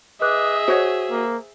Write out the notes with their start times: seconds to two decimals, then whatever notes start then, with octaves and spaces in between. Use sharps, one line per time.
0.22 G#4 B4 D#5 E5 D6 F#6
0.68 F#4 C5 C#5
1.11 A#3